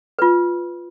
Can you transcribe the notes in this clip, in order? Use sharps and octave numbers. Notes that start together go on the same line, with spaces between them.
F4 B4